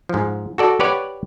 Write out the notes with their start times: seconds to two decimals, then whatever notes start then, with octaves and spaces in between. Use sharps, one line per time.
0.09 G#2 F3
0.58 F#4 A4 D5
0.80 G4 B4 C#5 D5 F#5